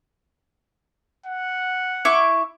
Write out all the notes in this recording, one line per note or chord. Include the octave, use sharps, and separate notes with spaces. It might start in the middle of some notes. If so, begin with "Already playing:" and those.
F#5
E4 C#6 D6